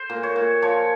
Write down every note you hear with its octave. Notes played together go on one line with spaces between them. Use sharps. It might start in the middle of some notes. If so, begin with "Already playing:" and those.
Already playing: C5
A#2
C#5
A#2
F3 C#5